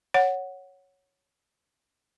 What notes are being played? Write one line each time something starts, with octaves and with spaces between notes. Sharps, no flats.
C#5 F#5